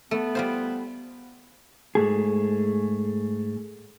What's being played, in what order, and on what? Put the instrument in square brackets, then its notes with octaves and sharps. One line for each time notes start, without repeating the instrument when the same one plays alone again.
[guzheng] A3 [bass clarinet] B3
[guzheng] G3 F4 C5
[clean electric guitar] G#2 A3 G#4